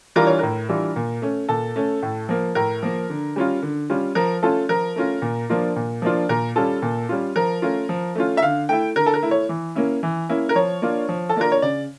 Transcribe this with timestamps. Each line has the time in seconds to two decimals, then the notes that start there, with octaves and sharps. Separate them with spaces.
0.16 E3 G3 D4 F4 A#4
0.27 C#5
0.39 A2 A#4
0.69 E3 G3 D4 F4
0.96 A#2
1.22 A3 C#4
1.49 A#2 A4
1.76 A3 C#4
2.03 A2
2.29 F3 A#3
2.55 A2 A#4
2.83 F3 A#3
3.10 D3
3.36 G3 C#4 F4
3.62 D3
3.90 G3 C#4 F4
4.15 F3 A#4
4.43 A3 C#4 F4 A4
4.69 F3 A#4
4.96 A3 C#4 F4
5.22 A#2
5.50 F3 A#3 D4 F4
5.76 A#2
6.02 F3 A#3 D4 F4
6.29 A#2 A#4
6.56 G3 C#4 F4 A4
6.82 A#2
7.09 G3 C#4 F4
7.36 F3 A#4
7.62 A3 C#4 F4
7.89 F3
8.15 A3 C#4 F4
8.37 E5
8.42 D3 F5
8.69 A3 E4 G5
8.96 D3 A#4
9.06 A4
9.14 A#4
9.23 A3 E4
9.31 C#5
9.49 E3
9.75 A#3 C#4 E4
10.03 E3
10.29 A#3 C#4 E4
10.49 A#4
10.55 F3 C#5
10.82 A#3 D4 F4
11.09 F3
11.29 A4
11.36 A#3 D4 F4 A#4
11.52 C#5
11.62 C#3 D5